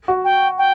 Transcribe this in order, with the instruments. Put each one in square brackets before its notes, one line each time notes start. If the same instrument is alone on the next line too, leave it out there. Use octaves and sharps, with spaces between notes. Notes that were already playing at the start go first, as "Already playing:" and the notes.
[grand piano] F#4
[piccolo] G5
G5